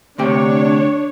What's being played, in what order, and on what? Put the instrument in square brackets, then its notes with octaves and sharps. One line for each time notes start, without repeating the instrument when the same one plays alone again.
[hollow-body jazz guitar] D2 C3 G4 [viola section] D4 C#5